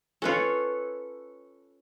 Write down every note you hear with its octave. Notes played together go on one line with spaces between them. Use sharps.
C#4 F4 A4 B4 C#5